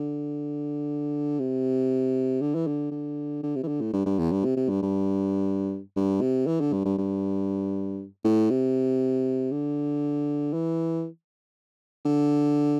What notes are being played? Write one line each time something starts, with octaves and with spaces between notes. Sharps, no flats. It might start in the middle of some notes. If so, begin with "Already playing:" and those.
Already playing: D3
C3
D3
E3
D3
D3
D3
C3
E3
D3
A2
G2
G2
E2
G2
C3
C3
G2
G2
G2
C3
E3
D3
G2
G2
G2
A2
C3
D3
E3
D3